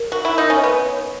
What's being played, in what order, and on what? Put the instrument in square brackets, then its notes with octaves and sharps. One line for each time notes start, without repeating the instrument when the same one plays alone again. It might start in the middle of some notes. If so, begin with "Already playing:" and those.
Already playing: [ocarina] A#4
[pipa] F#4
E4
D#4
C#4
[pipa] B3 [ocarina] B4
[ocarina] C#5